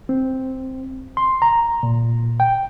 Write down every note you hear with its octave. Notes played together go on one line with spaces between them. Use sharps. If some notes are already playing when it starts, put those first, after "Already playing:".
C4
C6
A#5
A#2
G5